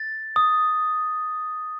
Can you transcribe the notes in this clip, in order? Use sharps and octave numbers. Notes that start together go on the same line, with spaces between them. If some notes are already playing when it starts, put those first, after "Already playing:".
Already playing: A6
D#6